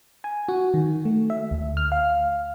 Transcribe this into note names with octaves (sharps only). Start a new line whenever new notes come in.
G#5
F#4
D#3
A3
E5
D2
F6
F5